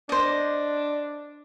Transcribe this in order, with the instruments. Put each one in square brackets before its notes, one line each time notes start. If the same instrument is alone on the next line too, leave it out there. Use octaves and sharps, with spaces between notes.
[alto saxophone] D4 [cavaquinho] C5 D#5